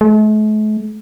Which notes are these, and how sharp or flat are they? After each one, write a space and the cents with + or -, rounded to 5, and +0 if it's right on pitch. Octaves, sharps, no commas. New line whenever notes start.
A3 -45